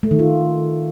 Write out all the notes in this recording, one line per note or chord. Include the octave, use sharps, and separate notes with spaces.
A3
D#3
F4